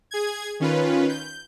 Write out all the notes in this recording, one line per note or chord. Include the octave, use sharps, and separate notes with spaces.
G#4 G#6
D#3 C#4 F4 B4
G6